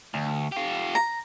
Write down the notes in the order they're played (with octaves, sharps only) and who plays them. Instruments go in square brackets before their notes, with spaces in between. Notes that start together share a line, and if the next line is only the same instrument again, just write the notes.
[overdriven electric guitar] D2
F4 G4
[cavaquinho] A#5